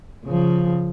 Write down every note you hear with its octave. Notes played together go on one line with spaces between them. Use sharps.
C#3 F3